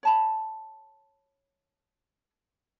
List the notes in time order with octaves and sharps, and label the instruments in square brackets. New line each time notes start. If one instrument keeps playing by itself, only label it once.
[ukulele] C#5 A5 B5